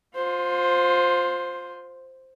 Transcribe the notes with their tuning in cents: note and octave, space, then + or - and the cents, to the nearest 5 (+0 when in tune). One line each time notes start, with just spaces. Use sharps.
F4 +25 C5 +0